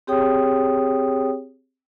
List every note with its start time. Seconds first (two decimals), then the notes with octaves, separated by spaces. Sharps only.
0.07 C4 G4 G#4 C#5 G5 D#6